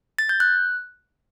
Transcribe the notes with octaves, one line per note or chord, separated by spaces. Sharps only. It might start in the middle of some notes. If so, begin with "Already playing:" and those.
A6
G6
F#6